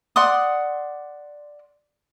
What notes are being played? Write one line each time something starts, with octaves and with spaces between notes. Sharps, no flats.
D5 F#5 C6 D#6